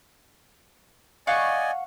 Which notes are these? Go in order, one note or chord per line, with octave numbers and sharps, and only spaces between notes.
D5 D#5 F5 F#5 G#5 C#6